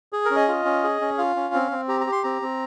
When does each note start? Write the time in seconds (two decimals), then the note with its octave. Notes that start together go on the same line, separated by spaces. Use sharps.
0.13 G#4
0.25 A#4
0.31 C#4
0.36 D#5
0.48 F4
0.65 C#4
0.84 G#4
1.01 C#4
1.18 F4 F5
1.36 C#4
1.54 C4
1.71 C4
1.88 G4 A#5
2.01 A#5
2.07 G4
2.12 C6
2.24 C4 A#5
2.42 C4